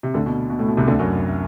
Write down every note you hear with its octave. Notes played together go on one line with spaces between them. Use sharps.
C3
D2 D3
B2
B2
A2
B2
C2 C3
D2 D3
F#2 F#3